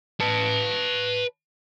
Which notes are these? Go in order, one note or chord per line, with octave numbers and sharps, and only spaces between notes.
B4 A5